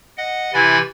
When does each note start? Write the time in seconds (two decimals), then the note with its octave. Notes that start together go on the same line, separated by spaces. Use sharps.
0.17 D#5 F#5
0.54 C3 E3 E4 G#5 B5 A6